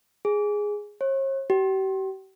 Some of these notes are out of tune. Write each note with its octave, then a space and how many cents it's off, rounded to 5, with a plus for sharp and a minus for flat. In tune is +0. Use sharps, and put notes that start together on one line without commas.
G#4 +0
C#5 -45
G4 -40